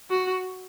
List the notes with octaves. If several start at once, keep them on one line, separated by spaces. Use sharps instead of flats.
F#4